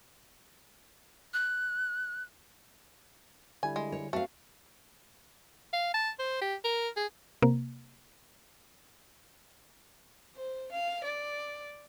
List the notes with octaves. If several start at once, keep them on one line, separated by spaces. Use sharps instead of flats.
F#6
D3 G3 E4 G#5
G#3
C#5
A3 C4 F#4 F5
F5
A5
C5
G4
A#4
G#4
C3 A#3
C5
F5
D5